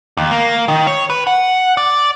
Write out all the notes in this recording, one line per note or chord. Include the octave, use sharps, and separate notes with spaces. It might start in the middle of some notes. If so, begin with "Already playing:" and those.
D#2
A#3
D#3
C#5
B4
F#5
D5